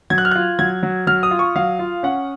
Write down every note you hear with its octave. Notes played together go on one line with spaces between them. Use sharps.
F#3 G#6
F#6
F6
F4 F#6
F#3 G#6
F#3
F#3 F6
D#6
F4
C#6
F#3 F5
F4
C#4 F#5